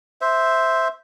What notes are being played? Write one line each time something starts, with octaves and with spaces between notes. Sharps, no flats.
C5 E5